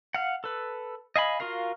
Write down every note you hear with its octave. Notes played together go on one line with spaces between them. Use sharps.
F5 F#5
A4 B4
D#5 F5 G#5 B5
F4 F#4 A#4 F5